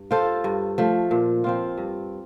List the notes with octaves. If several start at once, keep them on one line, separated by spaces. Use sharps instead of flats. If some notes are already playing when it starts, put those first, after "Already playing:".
Already playing: G2
F4 A4 C5
G2
F3 A3
A#2
F3 C4 F4
G2